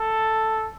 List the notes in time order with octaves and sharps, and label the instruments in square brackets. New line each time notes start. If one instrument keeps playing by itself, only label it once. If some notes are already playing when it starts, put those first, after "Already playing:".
Already playing: [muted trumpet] A4